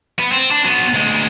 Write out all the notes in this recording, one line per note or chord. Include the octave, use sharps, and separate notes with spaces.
B3
C4
D4
F#3 B3
D2 G#3